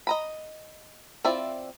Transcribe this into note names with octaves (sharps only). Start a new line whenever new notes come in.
D#5 A#5 B5
C4 E4 F4 D5 E5